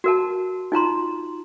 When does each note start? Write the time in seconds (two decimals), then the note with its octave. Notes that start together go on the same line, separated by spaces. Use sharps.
0.04 F#4 A#4 A5
0.72 D#4 F4 A#5 C6